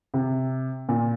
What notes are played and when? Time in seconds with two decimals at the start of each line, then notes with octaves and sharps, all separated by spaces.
0.14 C3
0.89 A#2